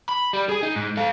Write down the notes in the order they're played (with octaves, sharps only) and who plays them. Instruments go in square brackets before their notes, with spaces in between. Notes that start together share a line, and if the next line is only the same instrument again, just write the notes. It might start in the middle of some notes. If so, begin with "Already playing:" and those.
[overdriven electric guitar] B5
G3
G#4 G#5
D#4
G#2
A4 F5